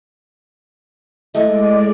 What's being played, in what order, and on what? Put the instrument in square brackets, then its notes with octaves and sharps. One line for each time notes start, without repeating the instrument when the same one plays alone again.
[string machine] G#3 D5 [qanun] A3 E4 [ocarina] D#5